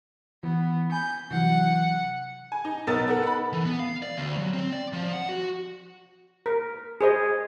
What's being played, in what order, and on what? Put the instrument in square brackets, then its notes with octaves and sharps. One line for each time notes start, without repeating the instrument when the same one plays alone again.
[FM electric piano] E3 [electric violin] B3
[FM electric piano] G#5 [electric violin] G6
[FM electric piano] C3 E3 F#3 [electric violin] F#5
[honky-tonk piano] G#5
D#4
B1 B3 A#4 D#5 E6 A6
B3 D#4 A4 A#4 F#5
F#5 B5
[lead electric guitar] E3
B3
F5
D5
D2
F#3
C4
D5
F3
F#5
F#4
[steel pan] A#4
G#4 C5 D#5